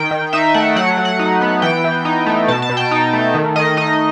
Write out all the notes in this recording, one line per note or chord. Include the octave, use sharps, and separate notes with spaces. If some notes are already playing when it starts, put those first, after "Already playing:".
Already playing: D#3 G5
D#3
D#4 E5
A3 F#5
F#3 F#5
F#3
F#5
D#4
B3
E3 G5
E3
D#4
A3
B2 A5
A5
B2
G5
D#4
A3
D#3
D#3 D#5
D#4 D#5